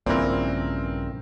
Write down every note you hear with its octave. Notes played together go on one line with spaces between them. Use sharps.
A#1 G2 A#2 C#3 E3 C4 A#4